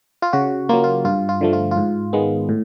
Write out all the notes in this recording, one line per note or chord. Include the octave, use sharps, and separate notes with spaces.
F4
C#3 F#4
F#3 A#3 F4
F4
G2 F4
F4
D3 F3 A3
F4
F4
G#2
D#3 G#3 B3
A2